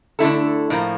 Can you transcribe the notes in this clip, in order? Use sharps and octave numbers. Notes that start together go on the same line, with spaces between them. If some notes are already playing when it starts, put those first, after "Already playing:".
D3 A3 E4 A4
A2 F3 A#3